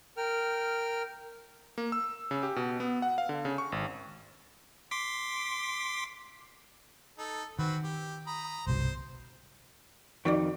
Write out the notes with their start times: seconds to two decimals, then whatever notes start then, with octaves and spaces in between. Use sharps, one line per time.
0.17 A#4 G5 F6
1.78 A#3
1.92 E6
2.31 C#3
2.43 G4
2.56 B2
2.80 B3
3.02 F#5
3.18 F5
3.29 D3
3.45 C#3
3.58 C#6
3.72 G#1
4.91 C6 D6 B6
7.18 D#4 A4
7.59 D#3 C4 F#4 B4
7.84 G4
8.27 A#5 B5 D#6
8.67 G1 C2 B2 C5
10.25 F2 D#3 F#4 D5 D6